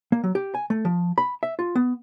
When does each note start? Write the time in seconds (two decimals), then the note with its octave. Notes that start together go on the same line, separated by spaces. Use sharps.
0.12 A#3
0.24 F#3
0.35 G4
0.55 G#5
0.70 A3
0.85 F3
1.18 B5
1.43 E5
1.59 F4
1.75 B3